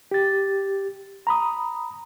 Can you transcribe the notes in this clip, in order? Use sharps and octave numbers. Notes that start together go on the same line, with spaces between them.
G4 A6
A#5 B5 D#6